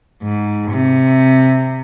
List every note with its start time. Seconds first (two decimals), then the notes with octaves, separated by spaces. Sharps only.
0.23 G#2
0.71 C3